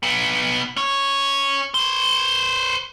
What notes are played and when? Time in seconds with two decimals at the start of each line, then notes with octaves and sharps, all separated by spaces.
0.03 B3 D#4
0.77 C#4 C#5
1.74 B4 C5